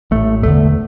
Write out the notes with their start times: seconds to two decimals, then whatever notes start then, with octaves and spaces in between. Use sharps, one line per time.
0.11 A1 A2 A3
0.43 E1 E2 D3 A3